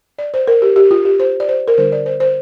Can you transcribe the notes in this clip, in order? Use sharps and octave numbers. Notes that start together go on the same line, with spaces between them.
D5
C5
A#4
G4
G4
F4
G4
C5
D5
C5
A#4
D3 G3 D4 C5
D5
C5
C5